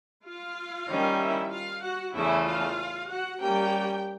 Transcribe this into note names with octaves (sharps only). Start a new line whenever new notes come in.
F4 F5
D#3 G3 A#3 C#4
E4 E5
F4 F5
F#4 F#5
E2 C#3 E3 A3 E4 E5
F4 F5
F#4 F#5
G3 A#3 C#4 G4 G5